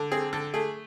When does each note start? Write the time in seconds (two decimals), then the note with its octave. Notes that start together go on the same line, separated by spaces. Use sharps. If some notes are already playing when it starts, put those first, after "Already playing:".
Already playing: D3
0.12 C4 G#4
0.33 D3 A4
0.54 A3 G#4